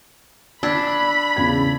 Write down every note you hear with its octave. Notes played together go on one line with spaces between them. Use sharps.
D4 B5 E6 G#6
E2 C#3 G#6